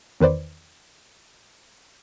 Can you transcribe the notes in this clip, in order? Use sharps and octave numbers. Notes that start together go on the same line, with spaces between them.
E2 D#3 B4 C5 D5